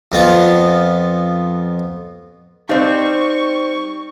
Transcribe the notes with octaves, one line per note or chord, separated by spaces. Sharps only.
F2 B3 F4
G3 C4 D#4 C5 D#5 F5 C#6